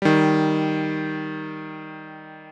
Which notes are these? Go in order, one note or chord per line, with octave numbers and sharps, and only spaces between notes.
D#3 G3